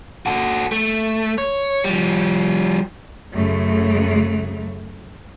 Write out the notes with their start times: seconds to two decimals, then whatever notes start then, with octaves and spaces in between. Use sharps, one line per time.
0.26 F#4 A4
0.72 A3
1.38 C#5
1.84 F3 G3
3.33 F#2 C#3 A3